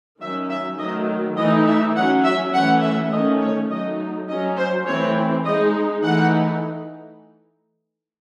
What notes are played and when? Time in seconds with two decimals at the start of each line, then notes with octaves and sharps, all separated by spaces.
0.21 D#3 F#3 C#4 E5
0.50 E5
0.79 D#3 F#3 A3 D#5
1.37 E3 A3 D#4 D#5
1.67 E5
1.96 F#3 C#4 F#5
2.24 E5
2.53 E3 A3 C#4 F#5
2.83 E5
3.11 D#3 A3 C#4 D#5
3.41 C#5
3.70 F#3 A3 D#4 D#5
4.28 F#3 C#4 D#5
4.57 C5
4.86 E3 A3 C4 C#5
5.44 G#3 D#4 D#5
6.03 E3 A3 D#4 F#5